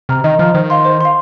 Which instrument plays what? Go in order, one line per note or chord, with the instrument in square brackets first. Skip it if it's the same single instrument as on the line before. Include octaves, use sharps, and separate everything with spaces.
[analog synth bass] C3 [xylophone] A#5 F6
[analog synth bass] D#3 [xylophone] D#5
[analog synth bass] F3 [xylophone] A#5 F6
[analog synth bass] D#3 [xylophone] C5
[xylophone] F5 C6
C5
F5 C6